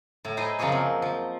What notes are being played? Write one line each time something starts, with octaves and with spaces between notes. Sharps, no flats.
A2
D#4 E4 G#4 C5 D#5
F#2 C#3 F3 A#3 G#4 C#5
C4
F3